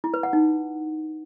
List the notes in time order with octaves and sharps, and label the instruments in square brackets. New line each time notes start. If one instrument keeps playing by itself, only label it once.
[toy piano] E4
B4
F#5
D#4